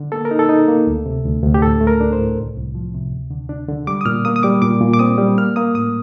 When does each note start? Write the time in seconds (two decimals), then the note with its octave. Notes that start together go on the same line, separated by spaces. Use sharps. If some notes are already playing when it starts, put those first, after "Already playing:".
Already playing: D3
0.12 A#3 A4
0.25 A#4
0.31 D#4
0.39 A4
0.49 D#4
0.68 A#3
0.87 D2
1.06 C3
1.25 D2
1.43 D2
1.54 G4
1.62 A2 A4
1.81 A3
1.87 A#4
2.00 D4
2.13 C5
2.18 A2
2.37 C2
2.57 C2
2.75 F3
2.94 C3
3.13 D2
3.31 D3
3.49 D4
3.68 D3
3.87 G3 D6
4.01 D#6
4.06 A#2 F6
4.25 A#3 D#6
4.36 D#6
4.43 G3 D6
4.62 A#2 D6
4.81 A#2
4.93 D6
4.99 C4 D#6
5.18 G3
5.38 A#3 F6
5.56 A#3 D#6
5.75 A2 D#6